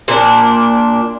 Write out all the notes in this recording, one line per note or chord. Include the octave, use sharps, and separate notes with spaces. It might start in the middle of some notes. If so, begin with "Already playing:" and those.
A#2 D4